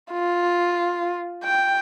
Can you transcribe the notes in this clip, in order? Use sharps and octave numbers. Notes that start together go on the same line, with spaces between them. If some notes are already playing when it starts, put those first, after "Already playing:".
F4
G5